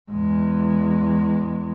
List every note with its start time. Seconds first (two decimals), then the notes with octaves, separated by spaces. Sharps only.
0.11 E2 G#3